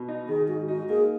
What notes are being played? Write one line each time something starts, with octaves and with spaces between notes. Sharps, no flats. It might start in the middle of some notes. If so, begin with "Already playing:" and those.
Already playing: B2
D#4
D#3 G#4
G#2 F#4
D#4 F#4
A#3 G#4